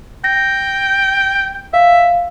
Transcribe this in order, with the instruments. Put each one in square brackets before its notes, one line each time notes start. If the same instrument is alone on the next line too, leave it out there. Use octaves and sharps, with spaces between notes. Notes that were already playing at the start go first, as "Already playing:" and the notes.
[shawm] G5 [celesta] A#6
[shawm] E5 [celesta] F5